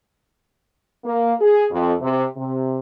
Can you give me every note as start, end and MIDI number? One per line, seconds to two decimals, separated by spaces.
1.04 1.34 58
1.40 1.64 68
1.71 1.93 41
2.02 2.25 48
2.36 2.79 48